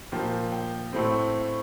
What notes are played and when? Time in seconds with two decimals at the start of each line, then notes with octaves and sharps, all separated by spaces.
0.12 A#2 F3 A#3 G5
0.52 G5
0.93 A2 A3 C4